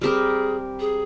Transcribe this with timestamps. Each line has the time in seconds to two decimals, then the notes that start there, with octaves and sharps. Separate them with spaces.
0.01 G3 C4 G4 G#4 A#4
0.80 G#4